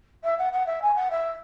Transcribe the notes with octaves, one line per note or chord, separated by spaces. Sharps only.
E5
F#5
F#5
E5
G#5
F#5
E5